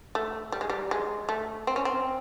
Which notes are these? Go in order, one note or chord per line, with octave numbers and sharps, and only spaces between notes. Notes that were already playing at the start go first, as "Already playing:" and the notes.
A3
G3
G#3
G3
G#3
A3
C4
C#4
C4